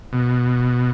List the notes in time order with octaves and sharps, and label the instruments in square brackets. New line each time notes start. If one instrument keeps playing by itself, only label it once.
[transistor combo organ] B2